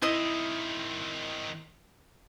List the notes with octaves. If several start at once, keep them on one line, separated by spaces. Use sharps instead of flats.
D#3 C4 E4 D#5 D#6